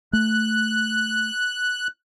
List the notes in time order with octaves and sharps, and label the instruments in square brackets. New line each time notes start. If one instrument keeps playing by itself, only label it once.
[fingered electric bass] A3 [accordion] F#6